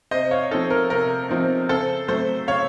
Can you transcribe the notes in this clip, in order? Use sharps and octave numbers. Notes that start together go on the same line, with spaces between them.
C3 C5 D#5
C#5 F5
F3 C4 D#4 A4
A#4
C3 A#4
F3 C4 D#4
C#3 A4 C5
F#3 A3 C4 A4 C5
C#3 C#5 F5